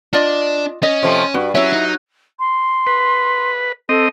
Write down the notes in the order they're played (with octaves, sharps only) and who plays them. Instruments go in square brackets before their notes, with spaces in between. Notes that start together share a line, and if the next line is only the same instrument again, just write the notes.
[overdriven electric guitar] D4 [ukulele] F4 D5 D#5
[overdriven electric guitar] C#4 [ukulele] D#5
[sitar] C3 F3 A3
[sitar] G2 [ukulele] F#4
[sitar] F#3 [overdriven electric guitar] C#4 [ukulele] E4 E5
[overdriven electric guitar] D#4
[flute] C6
[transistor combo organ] B4
[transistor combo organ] C4 D#5 [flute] A4